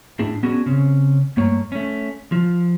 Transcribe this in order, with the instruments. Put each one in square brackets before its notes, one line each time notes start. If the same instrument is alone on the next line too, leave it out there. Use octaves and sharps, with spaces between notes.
[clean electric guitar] A2 D4 G#4
B3 C#4 D4 F#4 G#4
C#3 C4 C#4
G2 A3 A#3 C#5
A3 C#4
F3